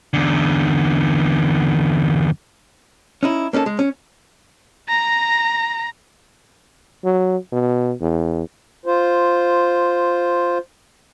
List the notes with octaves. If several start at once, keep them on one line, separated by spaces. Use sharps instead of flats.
E2 D3
C#4 D#4 E4
A#3 C#4 D#4 A4
G#3
C#4
A#5 A#6
F#3
B2
E2
F4 C5